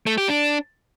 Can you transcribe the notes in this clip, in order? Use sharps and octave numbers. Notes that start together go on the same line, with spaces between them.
A3
G4
D4